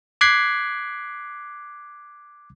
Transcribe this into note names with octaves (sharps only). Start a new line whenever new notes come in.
D6 F#6 G#6 B6 C7